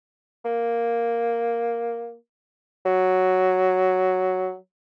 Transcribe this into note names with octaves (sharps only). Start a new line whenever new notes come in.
A#3
F#3